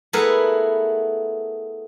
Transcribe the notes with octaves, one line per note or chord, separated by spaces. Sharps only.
A3 B3 E4 G#4 A#4 B4